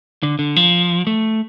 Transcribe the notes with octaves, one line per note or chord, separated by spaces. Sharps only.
D3
D3
F3
A3